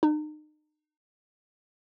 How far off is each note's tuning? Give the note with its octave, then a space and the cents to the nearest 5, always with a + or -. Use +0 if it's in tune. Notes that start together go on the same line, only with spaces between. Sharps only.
D#4 -35